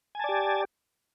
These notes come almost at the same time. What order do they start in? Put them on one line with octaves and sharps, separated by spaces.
G#5 A5 D5 G4